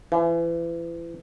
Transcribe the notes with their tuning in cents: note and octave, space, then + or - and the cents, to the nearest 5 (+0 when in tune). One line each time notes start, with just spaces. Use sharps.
E3 +35